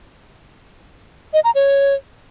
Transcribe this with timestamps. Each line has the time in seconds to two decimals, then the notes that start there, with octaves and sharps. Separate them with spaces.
1.33 D#5
1.44 A#5
1.55 C#5